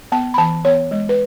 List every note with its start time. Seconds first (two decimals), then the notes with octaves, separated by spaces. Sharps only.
0.12 B3 A5
0.34 B5
0.38 E3 A5
0.65 B3 C#5
0.91 G#3
1.09 B4